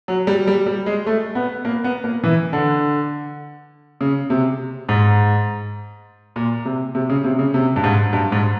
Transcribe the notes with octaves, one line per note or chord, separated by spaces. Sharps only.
F#3
G3
G3
G3
G#3
A3
B3
A#3
B3
A#3
E3
D3
C#3
C3
G#2
A#2
C3
C3
C#3
C3
C#3
C3
G2
G#2
G2
G#2